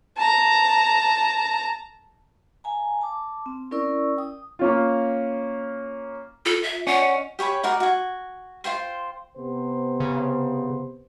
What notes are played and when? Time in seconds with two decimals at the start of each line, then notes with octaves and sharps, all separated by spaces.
0.17 A5 A#5
2.64 F5 G#5 A#5
3.01 A5 D6
3.46 C4
3.71 C#4 E4 A#4 D5 C#6 E6
4.17 G5 D#6
4.59 A#3 C#4 F4
6.46 F4 A4
6.63 E5
6.87 C#4 D5 F#5
7.01 D#5
7.39 G4 C#5 G#5 B5
7.63 D#4 F#4 A#4 D5
7.80 F#4 G#5
8.64 F4 C5 G5 C6
9.38 C3 B3 C5
10.00 C#3